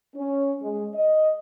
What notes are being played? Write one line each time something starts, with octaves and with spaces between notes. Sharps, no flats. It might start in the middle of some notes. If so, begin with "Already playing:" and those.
C#4
G#3
D#5